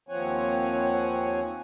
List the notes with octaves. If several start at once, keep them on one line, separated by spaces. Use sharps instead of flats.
D#2 F3 C4 C#5 F#5 G#5